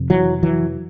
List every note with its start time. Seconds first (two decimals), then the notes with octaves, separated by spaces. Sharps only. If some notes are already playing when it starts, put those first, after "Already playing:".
Already playing: F2 C3
0.10 E3 F#3
0.43 E3 F#3